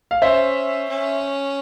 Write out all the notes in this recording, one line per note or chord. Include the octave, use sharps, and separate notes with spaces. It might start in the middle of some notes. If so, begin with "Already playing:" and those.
F5
C#4 C5 E5
C#4